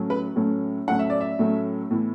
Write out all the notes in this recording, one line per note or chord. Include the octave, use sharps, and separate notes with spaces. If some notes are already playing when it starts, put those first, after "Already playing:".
Already playing: A2 F#3 A3 C#4
B4
A2 F#3 A3 C#4
A2 F#3 A3 C#4 F#5
E5
D5
E5
A2 F#3 A3 C#4
A2 E3 B3 E4